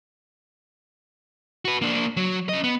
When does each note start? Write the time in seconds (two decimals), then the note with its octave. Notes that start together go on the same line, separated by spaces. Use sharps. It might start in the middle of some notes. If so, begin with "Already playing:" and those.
1.65 F#4 B4
1.82 A#3 D4
2.17 F#3
2.49 C#4 D#5
2.64 B3